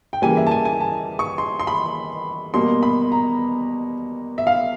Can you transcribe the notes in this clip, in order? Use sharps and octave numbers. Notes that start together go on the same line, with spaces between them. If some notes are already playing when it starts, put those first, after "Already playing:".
G5
C#3 E3 G3 A#3 G#5
E5
A5
G#5
G#5
A5
C#6
C6
C6
B5
B2 G3 A#3 C6
B5
A#5
E5
F5